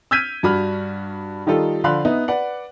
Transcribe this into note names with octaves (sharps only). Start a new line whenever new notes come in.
E6 F6 G6 G#6 B6 D#7
G2 F#4 B5 F6
D#3 G3 D#4 F4 A4
D3 F3 F5 B5 C6 F#6
B3 D#4 E5
B4 D5 F#5